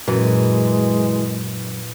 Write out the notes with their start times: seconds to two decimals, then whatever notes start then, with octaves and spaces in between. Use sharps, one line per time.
0.08 F#2 A#2 E3 G#3